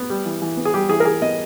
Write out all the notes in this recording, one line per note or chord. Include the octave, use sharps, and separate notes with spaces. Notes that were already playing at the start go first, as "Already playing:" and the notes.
Already playing: B3
G3
E3
E3
B3
G#4
G3 G4
E3 G#4
A#4
E3 G#4
B3 D#5